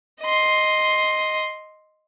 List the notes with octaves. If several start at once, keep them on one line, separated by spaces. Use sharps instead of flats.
D#5 C6